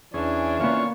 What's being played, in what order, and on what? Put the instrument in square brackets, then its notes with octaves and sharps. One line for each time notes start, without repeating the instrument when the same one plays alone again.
[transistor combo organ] E2 C#4 G#4 [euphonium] E3 [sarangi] D4
[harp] A#3 B3 [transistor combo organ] C#4 F4 C#5